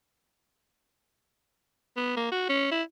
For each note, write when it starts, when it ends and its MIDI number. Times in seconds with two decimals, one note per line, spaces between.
1.97 2.14 59
2.17 2.29 58
2.32 2.47 66
2.49 2.67 61
2.71 2.82 64